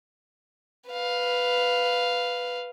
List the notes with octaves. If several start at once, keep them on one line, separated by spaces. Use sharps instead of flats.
B4 F5